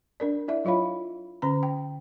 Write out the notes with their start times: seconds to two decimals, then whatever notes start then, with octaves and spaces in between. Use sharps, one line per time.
0.20 D4 A#4 D5
0.48 E4 D5 E5
0.65 F#3 F4 C#5 F5 B5
1.42 D3 C#4 A#5
1.63 G5